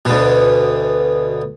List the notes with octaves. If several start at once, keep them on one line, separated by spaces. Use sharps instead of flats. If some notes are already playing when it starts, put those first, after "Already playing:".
D2 B2